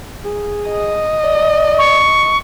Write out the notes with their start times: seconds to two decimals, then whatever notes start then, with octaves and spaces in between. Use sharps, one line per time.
0.24 G#4
0.70 D#5
1.24 D5
1.78 C#6